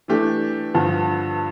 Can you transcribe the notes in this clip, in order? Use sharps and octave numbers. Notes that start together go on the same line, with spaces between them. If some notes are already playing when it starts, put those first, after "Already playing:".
E3 A3 D4 G4
G2 D3 F3